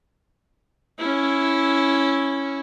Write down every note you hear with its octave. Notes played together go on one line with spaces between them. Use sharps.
C#4 E4